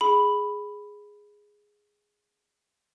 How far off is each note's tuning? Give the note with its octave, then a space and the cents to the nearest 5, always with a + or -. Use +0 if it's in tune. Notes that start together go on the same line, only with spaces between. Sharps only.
G#4 +0 B5 +0